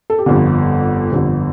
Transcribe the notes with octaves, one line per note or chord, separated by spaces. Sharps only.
A4
G4
G1 F2 D3 F4
G1 F2 D3